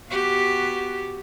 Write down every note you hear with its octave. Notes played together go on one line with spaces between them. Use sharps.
B3 F#4 G4